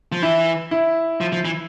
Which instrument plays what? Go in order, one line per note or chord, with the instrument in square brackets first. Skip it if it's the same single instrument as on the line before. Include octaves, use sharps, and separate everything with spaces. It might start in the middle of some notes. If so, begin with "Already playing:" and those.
[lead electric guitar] F3
[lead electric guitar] E3 [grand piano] E4
[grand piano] E4
[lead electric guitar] F3
F3
E3